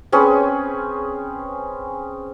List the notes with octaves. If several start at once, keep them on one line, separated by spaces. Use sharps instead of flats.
C4 C#4 G#4 B4